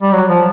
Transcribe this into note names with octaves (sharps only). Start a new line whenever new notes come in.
G3
F#3
F3